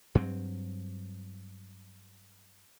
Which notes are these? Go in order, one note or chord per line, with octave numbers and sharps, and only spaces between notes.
G2 F#3 C4